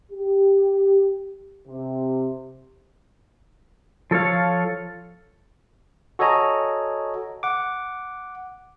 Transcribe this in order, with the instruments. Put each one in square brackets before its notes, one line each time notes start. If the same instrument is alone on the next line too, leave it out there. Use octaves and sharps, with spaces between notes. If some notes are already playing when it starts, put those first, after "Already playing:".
[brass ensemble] G4
C3
[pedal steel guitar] F3 A4 C#5 F5
[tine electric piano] F#4 A4 C#5 D#5 G#5 A#5
F#5 D6